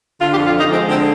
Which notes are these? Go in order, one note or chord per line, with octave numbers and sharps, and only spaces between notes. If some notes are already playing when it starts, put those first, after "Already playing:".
D3 F4
G4
F2
F4
F2 D#4
G#3 C4
D3 C4